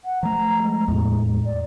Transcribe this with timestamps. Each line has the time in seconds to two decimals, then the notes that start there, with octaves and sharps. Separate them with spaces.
0.05 F#5
0.23 F3 A3 A#5
0.62 G#3
0.88 E2 A2
1.45 D5